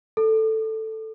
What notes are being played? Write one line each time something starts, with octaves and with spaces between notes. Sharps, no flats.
A4